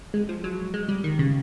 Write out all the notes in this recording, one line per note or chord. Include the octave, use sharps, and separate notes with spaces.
G#3
F3
F#3
G#3
G3
D#3
C#3